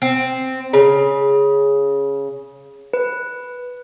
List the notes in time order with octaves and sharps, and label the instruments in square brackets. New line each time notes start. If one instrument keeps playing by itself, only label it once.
[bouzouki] C4
C#3
[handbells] B4